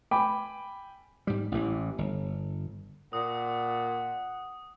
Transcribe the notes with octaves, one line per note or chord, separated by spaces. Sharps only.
G5 G#5 B5 D6
G#2 G3
A1 E3
G1
A#2 F#5 D#6